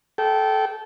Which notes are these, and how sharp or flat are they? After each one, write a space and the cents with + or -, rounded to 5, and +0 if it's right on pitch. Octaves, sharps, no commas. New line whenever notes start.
A4 -20 G5 -20